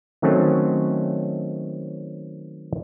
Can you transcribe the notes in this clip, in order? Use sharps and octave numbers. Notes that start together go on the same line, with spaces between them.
D#3 F#3 A3 C4 C#4